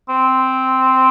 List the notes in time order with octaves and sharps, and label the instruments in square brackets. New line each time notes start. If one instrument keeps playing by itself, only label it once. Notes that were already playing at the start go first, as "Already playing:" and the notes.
[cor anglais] C4